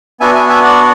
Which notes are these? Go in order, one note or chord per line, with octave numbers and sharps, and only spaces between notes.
B3 D4 F#4 E5 G#5
E5 G#5
E5 G#5
D5 F#5